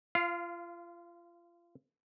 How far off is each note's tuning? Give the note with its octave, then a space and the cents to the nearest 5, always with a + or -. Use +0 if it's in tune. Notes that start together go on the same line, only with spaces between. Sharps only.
F4 -30 F5 +0